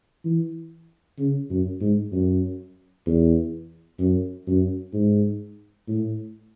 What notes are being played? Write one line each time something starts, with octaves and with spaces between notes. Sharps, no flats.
E3
C#3
F#2
G#2
F#2
E2
F#2
F#2
G#2
A2